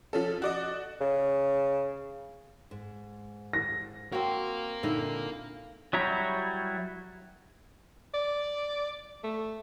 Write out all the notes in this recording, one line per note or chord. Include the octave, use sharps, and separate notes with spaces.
F3 C#4 A4
F#4 D5 D#5
C#3
G#2
A#6
C4 F#4 A#4 F5
A#2 D3 D#4 E4
F#3 G3 E4 C#5 A#5
D5
A3